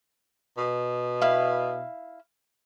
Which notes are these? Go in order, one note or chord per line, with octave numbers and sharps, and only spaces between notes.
B2
E4 F5